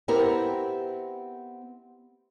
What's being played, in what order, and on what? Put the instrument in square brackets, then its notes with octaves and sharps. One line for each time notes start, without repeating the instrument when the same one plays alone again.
[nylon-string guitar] B3 C4 E4 G4 A#4